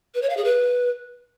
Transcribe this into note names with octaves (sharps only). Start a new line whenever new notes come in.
B4
C#5
F5
G#4
B4